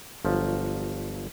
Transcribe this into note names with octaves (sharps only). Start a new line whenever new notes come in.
G1 F3 F#3